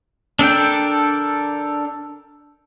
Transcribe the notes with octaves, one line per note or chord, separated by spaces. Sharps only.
D4 A4 A#4 G5